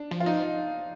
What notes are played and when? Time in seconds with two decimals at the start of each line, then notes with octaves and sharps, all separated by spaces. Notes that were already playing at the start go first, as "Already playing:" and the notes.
Already playing: D4
0.11 F3
0.20 F4
0.26 D#4